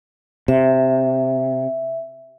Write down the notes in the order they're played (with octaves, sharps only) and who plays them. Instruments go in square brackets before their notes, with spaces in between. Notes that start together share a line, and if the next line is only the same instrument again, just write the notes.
[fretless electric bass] C3 [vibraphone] E5